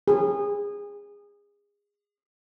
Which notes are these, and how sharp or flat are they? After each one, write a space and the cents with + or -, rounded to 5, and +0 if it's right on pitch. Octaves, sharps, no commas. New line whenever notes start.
G#4 -25